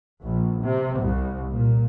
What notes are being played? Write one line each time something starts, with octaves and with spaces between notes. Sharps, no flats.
A#1
C3
C2
A#2